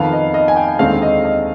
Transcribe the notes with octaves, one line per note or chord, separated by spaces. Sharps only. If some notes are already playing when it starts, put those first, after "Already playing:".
Already playing: F2 D#3 B3 F5
D#5
D#5
G#5
G5
D#2 D3 G#3 C4 F5
D#5
D#5